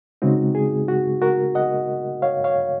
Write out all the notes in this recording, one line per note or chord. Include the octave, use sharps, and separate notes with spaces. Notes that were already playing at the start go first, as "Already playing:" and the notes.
C#3 G#3 C4 D#4 F#4
G#4
F#4
F#4 A#4
D#5 F#5
C#5 F5
C#5 F5